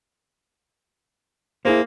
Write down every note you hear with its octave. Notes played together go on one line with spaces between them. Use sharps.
A#3 E4 G#4 C5